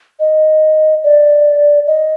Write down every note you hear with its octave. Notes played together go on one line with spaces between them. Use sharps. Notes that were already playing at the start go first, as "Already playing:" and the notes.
D#5
D5
D#5